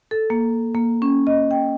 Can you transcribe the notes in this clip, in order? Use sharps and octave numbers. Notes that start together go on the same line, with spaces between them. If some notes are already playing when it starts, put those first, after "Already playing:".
A4
A#3
A#3
C#4
D#5
G5